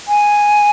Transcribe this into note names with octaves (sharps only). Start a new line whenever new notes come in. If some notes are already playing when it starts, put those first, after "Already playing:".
G#5